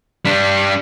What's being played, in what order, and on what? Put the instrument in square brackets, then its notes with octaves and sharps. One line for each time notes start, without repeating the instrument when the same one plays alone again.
[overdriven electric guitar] G3 D4